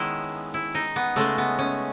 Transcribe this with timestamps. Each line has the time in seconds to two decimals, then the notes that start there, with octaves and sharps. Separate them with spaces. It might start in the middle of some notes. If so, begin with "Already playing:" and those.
Already playing: D#3 G#3 B3 C#4 E4
0.54 E4
0.75 D#4
0.96 B3
1.16 C#3 G#3 A3
1.38 B3
1.59 C#4